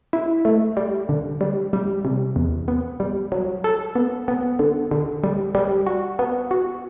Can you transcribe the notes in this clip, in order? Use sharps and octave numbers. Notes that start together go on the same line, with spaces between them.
E4
A3
G3
D3
G3
G3
C3
E2
B3
G3
F#3
A4
B3
B3
D3
D3
G3
G3
F#4
B3
F#4